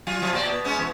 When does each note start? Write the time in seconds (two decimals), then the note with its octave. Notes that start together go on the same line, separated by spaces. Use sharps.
0.07 F#3 F4
0.21 F3 F#3 F4
0.33 A#2 G4 D5
0.47 B2
0.64 G#3 B3 C#4
0.79 E2 B2